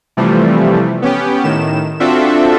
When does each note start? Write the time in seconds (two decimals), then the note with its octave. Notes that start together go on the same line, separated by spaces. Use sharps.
0.17 C3 E3 F3 G3 A3
1.02 B3 C#4 G4
1.44 A2 D#3 E7
2.00 C4 D4 F4 F#4 A4 E5